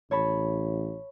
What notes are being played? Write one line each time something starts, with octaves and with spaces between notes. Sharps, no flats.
A1 C#5 A5 B5